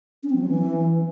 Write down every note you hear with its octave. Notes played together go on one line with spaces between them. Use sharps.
C#4
C4
F3
F#3
E3